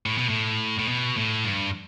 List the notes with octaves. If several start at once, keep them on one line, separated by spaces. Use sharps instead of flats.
A2
B2
A2
A2
B2
A2
G2